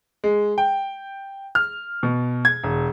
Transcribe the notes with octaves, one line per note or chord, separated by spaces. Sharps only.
G#3
G5
F6
B2
G#6
E1